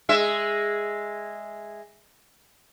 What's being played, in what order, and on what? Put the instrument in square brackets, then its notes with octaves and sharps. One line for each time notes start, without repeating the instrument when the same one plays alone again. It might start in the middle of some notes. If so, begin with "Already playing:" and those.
[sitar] G#3 E5